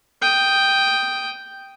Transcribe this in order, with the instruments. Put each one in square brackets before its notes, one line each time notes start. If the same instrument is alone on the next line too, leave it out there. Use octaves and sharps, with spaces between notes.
[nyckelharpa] G5 D#6